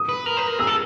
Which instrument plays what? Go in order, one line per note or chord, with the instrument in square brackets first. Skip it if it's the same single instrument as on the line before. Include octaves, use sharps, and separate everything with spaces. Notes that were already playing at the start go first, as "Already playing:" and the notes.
Already playing: [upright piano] D#6
[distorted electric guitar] B4
A#4
B4
A#4
[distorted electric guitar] G#4 [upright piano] E6
[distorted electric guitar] A4